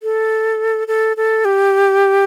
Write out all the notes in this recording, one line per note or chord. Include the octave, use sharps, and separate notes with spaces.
A4
A4
A4
G4